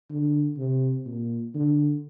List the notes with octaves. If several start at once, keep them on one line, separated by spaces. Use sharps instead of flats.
D3
C3
A#2
D3